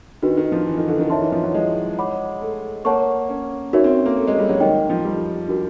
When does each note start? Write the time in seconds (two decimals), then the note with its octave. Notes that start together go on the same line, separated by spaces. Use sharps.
0.23 D#3 D4 F#4 B4
0.37 D#3
0.52 F3
0.67 E3
0.78 D#3
0.88 D3
1.00 D#3
1.10 D#3 C#5 E5 A5 C6
1.22 E3
1.32 F3
1.43 F#3
1.54 G#3
1.98 C#5 F#5 B5 D6
2.42 A3
2.85 A#3 C#5 F#5 A5 C#6
3.29 C#4
3.73 C#4 D#4 F#4 A#4 C#5 E5
3.84 C4
4.06 A#3
4.17 A3
4.27 G#3
4.38 G3
4.49 F#3
4.60 D#3 A#4 D#5 G5
4.90 F3
5.05 G3
5.48 D4 F#4 A#4